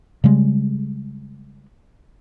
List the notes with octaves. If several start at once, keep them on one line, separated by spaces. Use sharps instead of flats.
C#3 G3 G#3